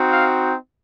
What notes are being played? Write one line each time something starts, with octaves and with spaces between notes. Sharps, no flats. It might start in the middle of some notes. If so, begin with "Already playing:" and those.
Already playing: C4 D#4 F#4
F5